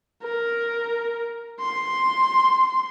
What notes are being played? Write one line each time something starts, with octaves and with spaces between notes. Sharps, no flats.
A#4
C6